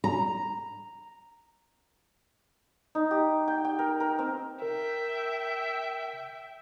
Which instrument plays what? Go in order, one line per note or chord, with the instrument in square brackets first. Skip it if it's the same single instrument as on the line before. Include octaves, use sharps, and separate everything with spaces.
[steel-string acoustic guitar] A#5
[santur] D#4
G4
G5
G5
A#4
A#4
C4
[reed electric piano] A#4 [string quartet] E5 G5